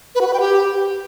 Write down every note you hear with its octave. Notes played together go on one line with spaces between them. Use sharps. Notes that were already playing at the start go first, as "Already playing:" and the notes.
B4
F#4
B4
G5
G4